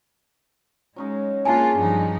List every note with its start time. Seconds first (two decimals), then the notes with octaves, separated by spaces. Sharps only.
0.96 F#3 G#3 C#4 D#4
1.45 A#3 C#4 D4 F4 G#4 G#5 A5
1.76 G2 F3 D#4